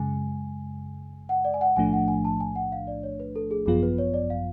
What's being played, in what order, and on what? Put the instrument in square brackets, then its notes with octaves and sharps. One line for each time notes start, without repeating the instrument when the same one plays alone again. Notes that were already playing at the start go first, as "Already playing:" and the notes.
Already playing: [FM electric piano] F#2 C#3 G#3 [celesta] G#5
[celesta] F#5
D5
G#5
F#5
[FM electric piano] B1 A2 F3 A3 D4 [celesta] G#5
[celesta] F#5
G#5
A5
G#5
F#5
F5
D5
C#5
B4
A4
G#4
[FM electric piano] G#1 F#2 F3 B3 F4 [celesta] G#4
[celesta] B4
C#5
D5
F5